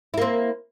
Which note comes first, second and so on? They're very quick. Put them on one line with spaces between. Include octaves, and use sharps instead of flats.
E4 A#3 C4